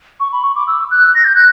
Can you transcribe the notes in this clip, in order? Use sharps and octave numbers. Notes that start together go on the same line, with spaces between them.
C#6
B5
C#6
D6
E6
F#6
A#6
G6
F#6